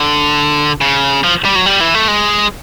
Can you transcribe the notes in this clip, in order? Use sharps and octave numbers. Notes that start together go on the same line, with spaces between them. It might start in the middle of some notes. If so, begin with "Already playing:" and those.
Already playing: D3
C#3
F3
G3
F#3
G3
E3
A3
G#3